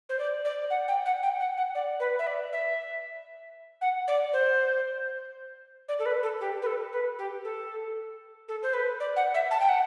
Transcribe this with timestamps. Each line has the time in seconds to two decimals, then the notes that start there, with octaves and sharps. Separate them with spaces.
0.09 C5
0.19 D5
0.45 D5
0.70 F#5
0.88 G5
1.06 F#5
1.23 G5
1.40 F#5
1.57 F#5
1.75 D5
2.00 B4
2.19 E5
2.27 D5
2.53 E5
3.81 F#5
4.08 D5
4.33 C5
5.89 D5
5.99 A4
6.06 B4
6.23 A4
6.41 G4
6.62 B4
6.66 A4
6.93 B4
7.19 G4
7.44 A4
8.48 A4
8.63 C5
8.74 B4
9.00 D5
9.16 F#5
9.34 E5
9.51 A5
9.60 G5
9.69 F#5